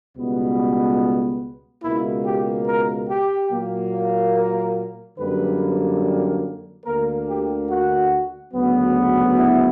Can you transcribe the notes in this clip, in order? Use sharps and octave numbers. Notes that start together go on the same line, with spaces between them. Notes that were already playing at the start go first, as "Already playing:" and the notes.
C#2 B2 G3 B3
C#2 B2 A#3 E4
G4
A#4
G4
A#2 F#3 A#3
A#4
F#2 D3 G3 A#3 B4
D2 D3 A#3 A#4
G4
F#4
D2 C#3 F#3 B3
E4